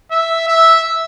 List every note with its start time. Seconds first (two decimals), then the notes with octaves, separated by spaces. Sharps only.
0.11 E5
0.48 E5